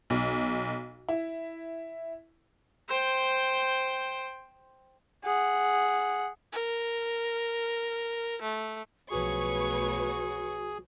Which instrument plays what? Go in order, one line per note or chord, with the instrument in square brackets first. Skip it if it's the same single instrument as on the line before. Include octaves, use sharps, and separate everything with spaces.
[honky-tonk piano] B1
E4
[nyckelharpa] C5 G5
[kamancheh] G#4 F#5
A#4
A3
[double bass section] B1 F3 A3 [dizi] F#4 [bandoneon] G#4 [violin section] B4 C#5 C#6